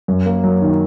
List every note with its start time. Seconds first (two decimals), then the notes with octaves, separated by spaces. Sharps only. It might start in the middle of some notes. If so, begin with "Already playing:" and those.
0.08 F#2
0.26 A#3
0.44 F#3
0.62 D#3